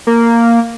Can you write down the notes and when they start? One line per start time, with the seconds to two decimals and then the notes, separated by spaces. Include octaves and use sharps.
0.07 A#3